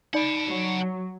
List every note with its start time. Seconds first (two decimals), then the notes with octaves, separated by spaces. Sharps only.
0.14 D#4 D5 F#5 A5 B5
0.47 F#3